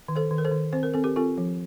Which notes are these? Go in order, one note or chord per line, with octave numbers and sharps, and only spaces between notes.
D#3
A4 C5
D#3
A#4
A4 C5
D#3
C4 C5
A#4
C4 A4
G4 A#4
C4 F4 A4
F3